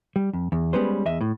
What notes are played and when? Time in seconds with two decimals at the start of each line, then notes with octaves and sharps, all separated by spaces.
0.16 G3
0.33 F2
0.52 E2
0.73 G3 G#3 B3 C#4 B4 C5
1.05 E2 D#5 E5
1.21 A2